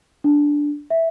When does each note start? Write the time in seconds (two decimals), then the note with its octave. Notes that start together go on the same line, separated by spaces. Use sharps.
0.24 D4
0.90 E5